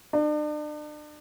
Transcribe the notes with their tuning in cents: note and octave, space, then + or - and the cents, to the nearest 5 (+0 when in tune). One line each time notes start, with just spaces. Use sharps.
D4 +40